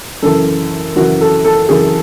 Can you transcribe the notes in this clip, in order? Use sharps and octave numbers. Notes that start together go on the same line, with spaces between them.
F#2 C#3 E3 A4
F#2 C#3 E3 F#4
A4
A4
F#2 C#3 E3 G#4